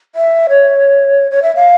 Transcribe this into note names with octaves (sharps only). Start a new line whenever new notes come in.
E5
C#5
C#5
E5
F5